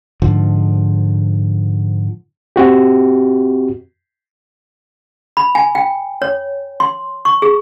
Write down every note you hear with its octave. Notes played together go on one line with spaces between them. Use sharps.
G#2 D3 F3
C4 F#4 G4
B5
G#5
G5
C#5
C6
C#6
G#4